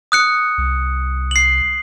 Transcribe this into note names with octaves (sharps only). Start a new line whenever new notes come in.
D#6 F#6 C#7
C2
C7 F#7